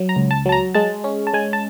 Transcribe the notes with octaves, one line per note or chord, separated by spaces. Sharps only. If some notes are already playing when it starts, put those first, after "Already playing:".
Already playing: F#3
A#5
C#2
A5
F#3 A5
A#5
G#3 A5
C#4
A5
G#3 G#5
A5